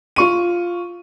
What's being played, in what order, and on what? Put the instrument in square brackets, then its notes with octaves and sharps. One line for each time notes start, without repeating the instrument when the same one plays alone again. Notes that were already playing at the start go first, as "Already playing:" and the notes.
[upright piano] F4 C#6 D#7